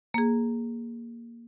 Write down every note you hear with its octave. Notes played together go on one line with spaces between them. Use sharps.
A#3 G#4